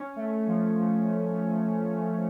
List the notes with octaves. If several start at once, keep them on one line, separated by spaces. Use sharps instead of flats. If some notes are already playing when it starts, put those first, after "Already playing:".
Already playing: C#4
A3
F3
F3